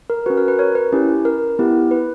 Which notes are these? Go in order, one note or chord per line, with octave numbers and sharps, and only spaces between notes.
A#4
C#4 F#4 B4
A#4
B4
A#4 C#5
B4
C#4 E4 G4
A#4
B3 E4 G4
B4